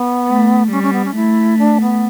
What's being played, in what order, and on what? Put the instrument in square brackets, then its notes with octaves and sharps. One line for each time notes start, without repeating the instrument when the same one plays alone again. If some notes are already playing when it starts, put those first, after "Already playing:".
Already playing: [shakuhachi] B3
[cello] A3
[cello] G3 [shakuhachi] C#4
[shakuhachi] C#4
B3
C#4
[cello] A3 [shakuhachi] E4
[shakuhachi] D4
B3